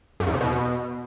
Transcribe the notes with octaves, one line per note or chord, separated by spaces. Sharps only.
F#2
E2
C3
B2